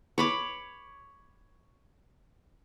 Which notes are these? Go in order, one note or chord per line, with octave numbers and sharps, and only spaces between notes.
C#5 B5 D6